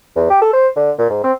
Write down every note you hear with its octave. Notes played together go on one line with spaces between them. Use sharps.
E2
G4
A4
C5
D3
A#2
G#2
C4